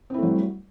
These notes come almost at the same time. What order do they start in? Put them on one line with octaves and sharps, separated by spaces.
C4 E4 A3 F#3 G3